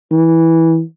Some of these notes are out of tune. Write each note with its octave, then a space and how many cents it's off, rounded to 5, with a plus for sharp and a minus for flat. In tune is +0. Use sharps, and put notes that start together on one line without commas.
E3 -10